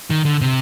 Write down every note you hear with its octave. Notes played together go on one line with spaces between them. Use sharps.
D#3
D3
C3